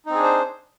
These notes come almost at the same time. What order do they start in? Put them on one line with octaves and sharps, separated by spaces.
D#4 C4 G#4 D4 C5